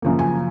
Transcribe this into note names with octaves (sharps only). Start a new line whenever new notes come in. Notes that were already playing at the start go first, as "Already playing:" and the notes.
F#2 C#3 F3 A#3
G#5